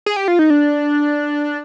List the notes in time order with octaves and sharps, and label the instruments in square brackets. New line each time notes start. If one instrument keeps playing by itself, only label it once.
[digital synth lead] G#4
G4
F4
D#4
D4